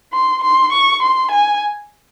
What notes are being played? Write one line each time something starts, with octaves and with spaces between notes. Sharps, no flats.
C6
C6
C#6
C6
G#5